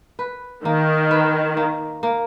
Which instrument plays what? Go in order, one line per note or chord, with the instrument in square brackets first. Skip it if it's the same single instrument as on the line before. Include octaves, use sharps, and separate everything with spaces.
[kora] B4
[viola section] D#3 [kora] A#3
[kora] B4
A#3
A#3